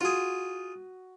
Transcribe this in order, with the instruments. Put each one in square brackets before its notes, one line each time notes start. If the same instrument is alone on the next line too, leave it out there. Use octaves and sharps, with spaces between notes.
[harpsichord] F4 G#4 [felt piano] F#4